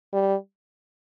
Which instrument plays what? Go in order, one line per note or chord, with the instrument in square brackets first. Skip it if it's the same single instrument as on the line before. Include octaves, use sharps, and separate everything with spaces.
[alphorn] G3